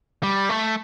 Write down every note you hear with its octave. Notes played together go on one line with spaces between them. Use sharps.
G3
A3